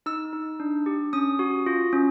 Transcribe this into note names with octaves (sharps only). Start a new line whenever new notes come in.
D#4 E6
D#4
D4
G4
C#4 D#6
F#4
F4
C#4